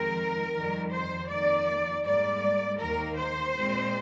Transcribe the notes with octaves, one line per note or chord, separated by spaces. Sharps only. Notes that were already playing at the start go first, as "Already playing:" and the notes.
Already playing: F2 D#3 G#3 C4 A#4
F2 D#3 G3
C5
F2 D#3 A#3 D5
G#2 G3 A#3 D5
D#2 D#3 A#3 A#4
C5
A#2 G#3 C4